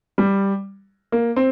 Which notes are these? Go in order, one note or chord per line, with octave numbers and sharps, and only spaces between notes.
G3
A#3
C4